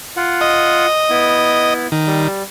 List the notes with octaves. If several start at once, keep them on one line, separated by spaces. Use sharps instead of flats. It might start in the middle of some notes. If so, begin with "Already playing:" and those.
F4 F#5
D#5
B3 E4
D#3
G3